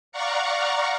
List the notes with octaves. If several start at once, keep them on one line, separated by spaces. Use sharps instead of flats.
D5 F5 F#5 A#5 C#6